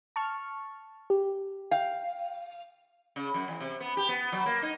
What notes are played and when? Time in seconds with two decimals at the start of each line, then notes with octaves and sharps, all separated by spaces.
0.16 A5 C#6 F6
1.10 G4
1.71 F5 G5
3.16 C#3
3.34 F#2
3.48 E2
3.60 C3
3.80 B3
3.97 G4
4.09 B3
4.32 F#3
4.46 A#3
4.62 D#4